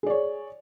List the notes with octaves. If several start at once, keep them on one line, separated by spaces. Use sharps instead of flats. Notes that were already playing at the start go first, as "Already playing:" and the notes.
G#4 C#5 D5